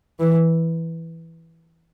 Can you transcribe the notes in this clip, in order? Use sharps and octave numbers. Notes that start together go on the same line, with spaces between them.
E3